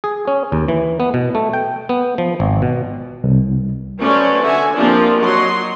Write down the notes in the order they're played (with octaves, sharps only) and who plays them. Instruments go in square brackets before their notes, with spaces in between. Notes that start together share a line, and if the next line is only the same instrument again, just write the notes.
[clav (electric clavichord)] G#4
C#4
D#2
E3
B3
B2
A3
G5
B3
F3
G#1
B2
[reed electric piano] C2
[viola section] F#3 A3 C#4 B4 C5 D5
D3 F#4 E5 G#5
F3 A#3 C4 D4 F4 G4
F#3 F#4 D#5 C6